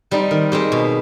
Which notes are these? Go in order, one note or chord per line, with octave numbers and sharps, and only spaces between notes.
G3 C4 D#4
D#3
G#3 C4 G4
B2